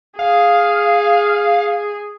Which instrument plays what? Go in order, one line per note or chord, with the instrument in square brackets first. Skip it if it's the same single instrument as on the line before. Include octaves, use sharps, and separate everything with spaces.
[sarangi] G#4 [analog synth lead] F5